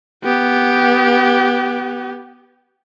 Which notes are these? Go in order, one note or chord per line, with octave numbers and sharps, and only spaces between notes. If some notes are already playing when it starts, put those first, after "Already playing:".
B3 G4